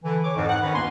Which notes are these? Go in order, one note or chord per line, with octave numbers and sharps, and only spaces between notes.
D3 E3
C#5 D6
F2 G#2
F#5
D#3 C#4 B4
C#2 G2 A#3 B3 G#5 C6